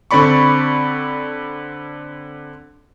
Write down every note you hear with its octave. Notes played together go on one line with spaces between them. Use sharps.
D3 C4 D5 B5 C#6